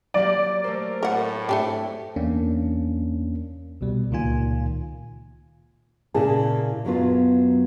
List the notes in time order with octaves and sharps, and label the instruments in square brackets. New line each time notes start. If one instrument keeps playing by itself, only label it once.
[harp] F#3 A#3 G4 [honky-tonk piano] D5
[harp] A3 A#3 C5 [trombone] A#4
[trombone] A2 [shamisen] A#4 F#5
[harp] G#2 C#7 [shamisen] A3 D4 G4
[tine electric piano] E2 A#3 C#4 D4
C2 B2 G3
C#2 A#2 D#3 F4 G#5
[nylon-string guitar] A#2 C#3 E4 G#4 A5
F#2 F#3 B3 F4